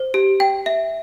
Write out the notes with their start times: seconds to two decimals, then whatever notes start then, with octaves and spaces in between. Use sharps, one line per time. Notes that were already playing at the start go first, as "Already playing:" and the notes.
Already playing: C5
0.14 G4
0.40 G5
0.66 E5